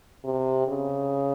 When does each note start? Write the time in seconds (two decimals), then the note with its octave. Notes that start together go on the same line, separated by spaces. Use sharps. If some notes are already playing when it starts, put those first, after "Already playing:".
0.25 C3
0.68 C#3